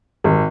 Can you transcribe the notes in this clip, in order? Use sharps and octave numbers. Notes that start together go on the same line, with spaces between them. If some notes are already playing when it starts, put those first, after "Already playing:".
G#1